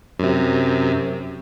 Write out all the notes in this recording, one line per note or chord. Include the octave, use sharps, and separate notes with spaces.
F#2 C3